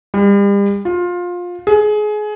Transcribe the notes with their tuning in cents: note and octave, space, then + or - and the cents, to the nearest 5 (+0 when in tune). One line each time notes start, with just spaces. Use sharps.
G3 +40
F4 +20
G#4 +25